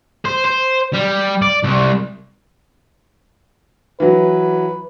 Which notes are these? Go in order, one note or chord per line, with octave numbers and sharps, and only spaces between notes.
C5
C5
G3
D5
C2
E3 F#3 B4